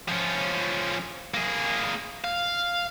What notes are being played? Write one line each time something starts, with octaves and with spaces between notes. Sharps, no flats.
F3 C#4
A#3 G#4
F5